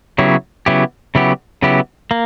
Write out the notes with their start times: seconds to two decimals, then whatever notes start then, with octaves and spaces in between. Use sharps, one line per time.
0.18 C#3 F#3 B3 E4 G4
0.66 C#3 F#3 B3 E4 G4
1.15 C#3 F#3 B3 E4 G4
1.62 C#3 F#3 B3 E4 G4
2.11 A#3